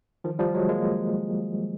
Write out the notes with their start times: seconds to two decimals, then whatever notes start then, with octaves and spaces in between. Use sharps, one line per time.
0.24 D#3 F3
0.39 F3 G3
0.54 F#3 G#3
0.69 G#3 A#3